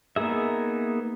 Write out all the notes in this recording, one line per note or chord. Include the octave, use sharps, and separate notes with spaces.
A#3 B3 D#4 G#4 E5